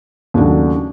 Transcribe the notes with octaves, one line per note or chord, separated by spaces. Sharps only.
D#2 C#3 F#3 A3 D4